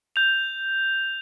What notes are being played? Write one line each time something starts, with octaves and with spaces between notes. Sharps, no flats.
G6 F7